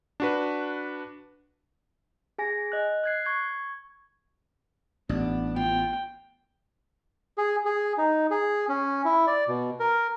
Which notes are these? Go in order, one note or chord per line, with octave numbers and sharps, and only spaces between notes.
D4 F#4 B4
G#4 G#5 A#6
D#5 F#6
F#6 G#6 C7
C#6 G#6
A1 B3 D4
F4 G5
G#4
G#4
D#4
G#4
C#4
E4
D5
B2
A#4